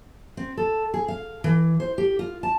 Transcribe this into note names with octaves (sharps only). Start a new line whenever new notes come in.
C4
A4
G#4
F5
E3
C5
G4
F4
A5